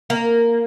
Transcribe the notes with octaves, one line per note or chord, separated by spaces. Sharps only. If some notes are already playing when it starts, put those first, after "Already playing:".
A#3